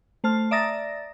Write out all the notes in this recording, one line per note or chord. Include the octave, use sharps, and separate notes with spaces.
A3 C5 A5 F6
D5 E5 A#5 D#6 A6 A#6